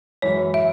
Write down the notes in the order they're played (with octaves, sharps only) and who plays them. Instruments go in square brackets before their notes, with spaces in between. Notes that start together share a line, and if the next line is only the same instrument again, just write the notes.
[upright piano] F#2 E3 G#3 [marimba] C#5
[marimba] E5